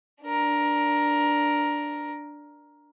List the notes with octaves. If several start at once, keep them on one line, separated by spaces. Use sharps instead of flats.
D4 A#4